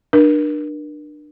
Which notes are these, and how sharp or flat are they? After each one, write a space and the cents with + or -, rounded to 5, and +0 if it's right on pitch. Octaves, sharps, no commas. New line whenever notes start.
D4 +30 A#4 +35